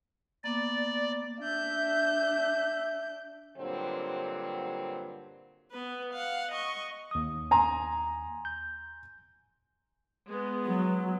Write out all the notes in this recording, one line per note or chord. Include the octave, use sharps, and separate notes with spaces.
A#3 B3 D5 D6
D4 E5 G6
G2 A#2 D3 F#3 C4
B3 B4
F5 F#5
D#5 C#6
D#2 D#6
G#5 A#5 C6
G6
G#3 B3
F#3